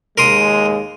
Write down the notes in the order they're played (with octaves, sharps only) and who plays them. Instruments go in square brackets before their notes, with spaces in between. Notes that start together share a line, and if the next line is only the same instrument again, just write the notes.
[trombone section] D#2 G#3 [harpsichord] A#4 C6 D#6